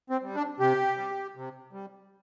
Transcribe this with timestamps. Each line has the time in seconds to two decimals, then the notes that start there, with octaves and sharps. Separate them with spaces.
0.10 C4
0.23 G3
0.35 D4
0.60 C3 G4
0.97 G3
1.36 C3
1.73 G3